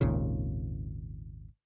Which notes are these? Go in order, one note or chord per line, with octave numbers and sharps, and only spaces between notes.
G#1 D#2 A#2 C#3